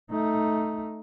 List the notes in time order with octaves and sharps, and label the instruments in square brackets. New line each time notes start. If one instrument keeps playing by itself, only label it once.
[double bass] A3 D#4